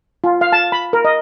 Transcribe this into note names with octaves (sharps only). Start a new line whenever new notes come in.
F4
F5
A5
B5
A#4
D#5